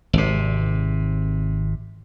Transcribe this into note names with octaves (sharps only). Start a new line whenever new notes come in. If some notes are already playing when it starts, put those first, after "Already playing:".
G#1 C3